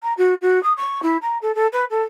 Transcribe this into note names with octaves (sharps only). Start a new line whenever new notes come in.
A#5
F#4
F#4
D#6
C#6
E4
A#5
A4
A4
B4
A4